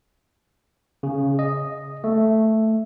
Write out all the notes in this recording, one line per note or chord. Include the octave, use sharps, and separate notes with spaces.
C#3
D#5
A3